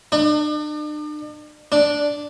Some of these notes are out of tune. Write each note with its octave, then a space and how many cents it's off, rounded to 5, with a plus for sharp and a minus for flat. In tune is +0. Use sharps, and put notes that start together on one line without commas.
D4 +45
D4 +0